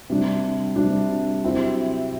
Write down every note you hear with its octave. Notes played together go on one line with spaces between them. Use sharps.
C3 G3 D4
C3 G3 D4
C3 F#3 C4 E4